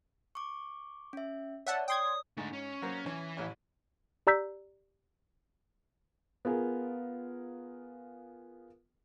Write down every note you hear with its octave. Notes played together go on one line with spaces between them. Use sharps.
C#6 D6
C#4 E5
C#5 D5 E5 F#5 A5
G5 C6 D#6 G#6
G#2 A3 D4
C#4
F#3 A#3 C5
E3 C#4
A1 E4 C#5
G4 D5 A#5 E6 G6 B6
B3 F4 G#4 A#4